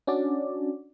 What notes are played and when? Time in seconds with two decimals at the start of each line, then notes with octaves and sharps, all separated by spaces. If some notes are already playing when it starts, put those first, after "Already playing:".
0.07 C#4 D4 F#4 D5